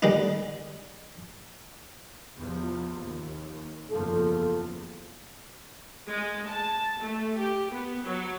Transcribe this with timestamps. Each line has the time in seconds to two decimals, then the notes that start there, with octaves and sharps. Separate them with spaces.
0.02 D3 G3 G#3 D4 D#4
2.37 E2 C3 F3
2.99 D#2
3.91 F#1 E2 F3 A4
6.09 G#3
6.49 A5
7.02 A3
7.39 G4
7.73 B3
8.04 F#3